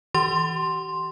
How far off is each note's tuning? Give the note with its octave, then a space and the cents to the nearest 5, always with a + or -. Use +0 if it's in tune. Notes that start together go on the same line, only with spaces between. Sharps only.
E3 -25 G4 -35 C6 +0